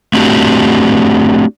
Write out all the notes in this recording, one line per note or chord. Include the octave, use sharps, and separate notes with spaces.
A3 C4 D4 F#4 G4